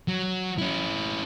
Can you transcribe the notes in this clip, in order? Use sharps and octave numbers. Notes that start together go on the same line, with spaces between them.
F#3
C#4 E4